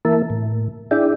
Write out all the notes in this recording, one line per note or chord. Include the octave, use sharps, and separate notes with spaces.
E3 A#3 A#4 E5 A5
A2
D4 E4 G#4 D5 E5 G5